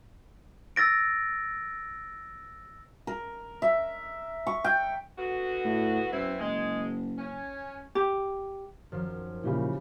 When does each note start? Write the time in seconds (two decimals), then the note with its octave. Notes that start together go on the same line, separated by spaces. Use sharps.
0.76 E6 A6 A#6 D7
3.07 A#4
3.62 E5
4.47 C#6
4.64 G5
5.18 D3 B3 F#4
5.65 A2
6.13 F#2 B3 C4 E4
6.40 F#1 G#3
7.18 C#4
7.95 G4
8.92 F#2 D#3 F3
9.43 A#2 C#3 E3 F#4 G4 B5